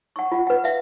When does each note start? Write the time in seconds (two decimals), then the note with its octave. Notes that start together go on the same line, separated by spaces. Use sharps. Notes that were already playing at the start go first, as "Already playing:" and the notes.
0.16 F#5 C#6
0.32 F4 F#5
0.47 B4 F#5
0.64 E5 F5